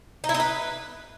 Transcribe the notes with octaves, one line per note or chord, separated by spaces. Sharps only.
D#4
E4
D#4
B4